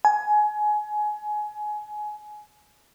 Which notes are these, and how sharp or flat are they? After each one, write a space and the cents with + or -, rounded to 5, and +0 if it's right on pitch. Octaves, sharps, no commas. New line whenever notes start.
G#5 +20